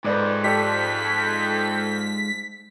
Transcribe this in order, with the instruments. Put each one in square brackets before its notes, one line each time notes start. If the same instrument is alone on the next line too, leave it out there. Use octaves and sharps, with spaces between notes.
[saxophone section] F2 [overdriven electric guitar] G#2 [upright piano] B4 D5 D6
[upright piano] G4 A4 D5 [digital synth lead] B6